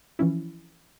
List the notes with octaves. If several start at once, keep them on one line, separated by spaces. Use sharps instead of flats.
E3 F3 C#4 E4